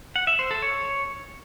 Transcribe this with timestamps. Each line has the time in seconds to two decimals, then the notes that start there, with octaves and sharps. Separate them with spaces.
0.16 F#5
0.27 E5
0.39 C5
0.51 A4
0.62 C#5